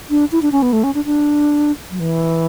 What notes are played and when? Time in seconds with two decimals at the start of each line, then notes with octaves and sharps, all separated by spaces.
0.10 D4
0.32 E4
0.42 D4
0.52 C#4
0.62 B3
0.73 A3
0.84 C#4
0.95 D4
1.05 D4
1.91 F#3
2.00 E3